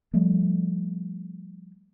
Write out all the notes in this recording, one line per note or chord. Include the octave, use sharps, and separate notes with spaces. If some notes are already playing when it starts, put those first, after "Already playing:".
F3 G3 A3